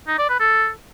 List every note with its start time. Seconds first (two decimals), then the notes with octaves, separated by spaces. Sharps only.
0.08 D#4
0.19 D5
0.29 B4
0.40 A4